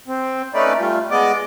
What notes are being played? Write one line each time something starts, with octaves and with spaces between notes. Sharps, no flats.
C4
A3 C#4 D#4 B4 D5
G3 A3 F4
G#3 B3 D5 D#5 D6